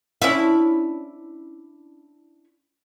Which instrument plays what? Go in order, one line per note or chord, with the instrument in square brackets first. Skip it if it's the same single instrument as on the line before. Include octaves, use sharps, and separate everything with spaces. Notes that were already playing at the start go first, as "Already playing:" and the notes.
[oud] C#4 D4 E4